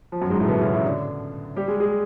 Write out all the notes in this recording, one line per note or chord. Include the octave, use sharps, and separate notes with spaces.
F3
F#2 F#3
G#2 G#3
A2 A3
B2 B3
C#3 C#4
E3 E4
D3 D4
G3 G4
G#3 G#4
G#3 G#4